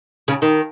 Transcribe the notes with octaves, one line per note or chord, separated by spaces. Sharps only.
C#3
D#3